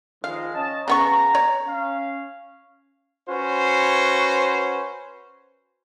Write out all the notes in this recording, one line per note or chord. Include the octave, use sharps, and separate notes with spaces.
D#3 F3 G#3 F5
C#4 D#5 A5
C#3 B3 A#5 C#6
C#5
C#4 F5
C#4 F#4 B4 C5